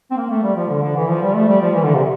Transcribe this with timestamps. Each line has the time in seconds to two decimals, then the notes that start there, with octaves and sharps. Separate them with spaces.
0.11 C4
0.17 A#3
0.30 A3
0.43 G3
0.56 F3
0.69 D3
0.82 D3
0.96 E3
1.08 F3
1.22 G3
1.35 A3
1.48 G3
1.61 F3
1.74 E3
1.84 D3
1.94 C3